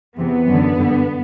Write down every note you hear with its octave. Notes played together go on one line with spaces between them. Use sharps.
E2 C3 E3 B3
F#2 D3
G2 D3